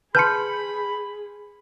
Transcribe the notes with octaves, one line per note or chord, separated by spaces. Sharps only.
G#4 B4 A5 B5 C6 G6 C#7